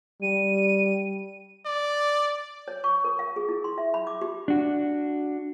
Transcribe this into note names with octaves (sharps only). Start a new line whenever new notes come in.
G3 D#7
D5
C#5
C#6
A#4
F5
G#4
E4
C6
E5
B5
D6
G4
D4 F#4